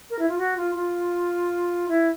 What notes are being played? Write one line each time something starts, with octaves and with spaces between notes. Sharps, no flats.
A#4
E4
F4
F#4
F4
F4
E4